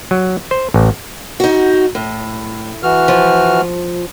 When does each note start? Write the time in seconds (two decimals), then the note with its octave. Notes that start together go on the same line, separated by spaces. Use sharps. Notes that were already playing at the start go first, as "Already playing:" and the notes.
0.11 F#3
0.51 C5
0.74 A1
1.40 D#4 F#4
1.95 A2
2.83 E3 F#4 F6
3.08 F3